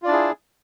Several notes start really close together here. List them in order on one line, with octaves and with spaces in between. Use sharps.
F4 D5 D4 E4 G#4